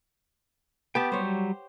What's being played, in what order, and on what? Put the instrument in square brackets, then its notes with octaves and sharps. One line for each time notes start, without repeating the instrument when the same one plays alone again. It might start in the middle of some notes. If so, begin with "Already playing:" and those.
[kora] B3 G4 [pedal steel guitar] G5 A5
[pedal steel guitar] F#3 G3 [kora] C5 C#5